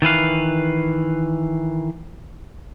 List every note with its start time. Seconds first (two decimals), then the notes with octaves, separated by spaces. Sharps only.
0.02 D#3 E3 B4 F5